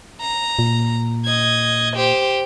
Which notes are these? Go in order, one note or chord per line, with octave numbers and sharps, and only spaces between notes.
A#5
A#2
D#5 G#6
G4 C5